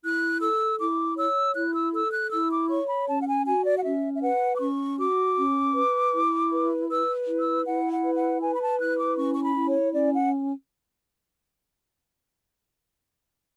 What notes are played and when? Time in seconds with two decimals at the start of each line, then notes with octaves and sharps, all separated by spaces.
0.02 E4 F#6
0.40 A4 E6
0.78 E4 D6
1.16 C#5 E6
1.54 E4 F#6
1.74 E6
1.92 A4 E6
2.11 F#6
2.31 E4 E6
2.51 D6
2.69 C#5 C#6
2.88 B5
3.07 C#4 A5
3.20 F#5
3.27 G#5
3.45 F#4 G#5
3.65 D5
3.78 F#5
3.84 C#4 E5
4.12 E5
4.21 B4 F#5
4.55 D6
4.59 C#4 C#6
4.98 F#4 D6
5.36 C#4
5.75 B4
6.12 E4
6.50 B4
6.89 B4 E6
7.27 E4
7.39 E6
7.65 E4 F#5
7.91 F#5
8.03 B4
8.15 F#5
8.41 B4 G#5
8.54 B5
8.60 A5
8.79 E4 F#6
8.98 D6
9.17 C#4 C#6
9.34 C#6
9.43 B5
9.56 E4
9.68 C#5
9.93 C#4 D5
10.12 F#5